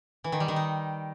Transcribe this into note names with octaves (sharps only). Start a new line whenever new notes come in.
E3
D#3
G3
D#3
D#4